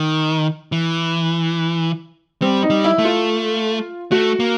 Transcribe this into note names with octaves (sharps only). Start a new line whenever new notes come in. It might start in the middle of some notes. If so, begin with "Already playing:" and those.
Already playing: D#3
E3
G3 C4
D#4
G3
E4
A3
F4
A3 F#4
A#3